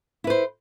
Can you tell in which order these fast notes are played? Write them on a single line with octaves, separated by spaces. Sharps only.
E4 B4 C5